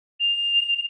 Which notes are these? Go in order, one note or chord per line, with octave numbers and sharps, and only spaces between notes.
F7